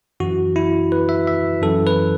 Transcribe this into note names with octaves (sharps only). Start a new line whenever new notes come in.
F#2 E3 F#4
E4
B4
E5
E5
F#2 E3 A4
B4